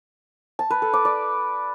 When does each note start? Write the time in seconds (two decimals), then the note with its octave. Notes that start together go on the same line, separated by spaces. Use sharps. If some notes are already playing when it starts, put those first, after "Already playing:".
0.59 A5
0.70 B4
0.82 A4
0.93 D6
1.05 D5